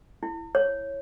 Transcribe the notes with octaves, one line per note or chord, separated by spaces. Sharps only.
E4
C#5